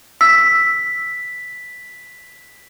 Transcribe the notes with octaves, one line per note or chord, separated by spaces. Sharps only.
E6 B6